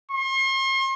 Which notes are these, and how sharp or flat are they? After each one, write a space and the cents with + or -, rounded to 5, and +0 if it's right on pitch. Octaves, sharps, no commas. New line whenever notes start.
C6 +45